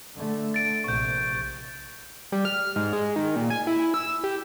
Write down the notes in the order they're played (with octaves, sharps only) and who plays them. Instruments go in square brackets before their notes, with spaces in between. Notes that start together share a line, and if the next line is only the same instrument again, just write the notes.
[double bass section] D3 A3
[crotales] A6 D7
[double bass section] A#1 C3 [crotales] C#6 G6
[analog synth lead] G3
F6
G#2
G#3
D#3
A#2
G#5
E4
E6
G4